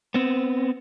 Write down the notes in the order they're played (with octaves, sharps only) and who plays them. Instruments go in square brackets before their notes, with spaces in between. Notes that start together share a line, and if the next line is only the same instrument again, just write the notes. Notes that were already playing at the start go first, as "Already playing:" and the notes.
[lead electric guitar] B3 C4